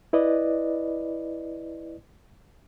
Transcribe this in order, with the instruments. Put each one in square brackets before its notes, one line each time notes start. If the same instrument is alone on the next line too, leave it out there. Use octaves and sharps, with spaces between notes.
[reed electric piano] E4 B4 D5 D#5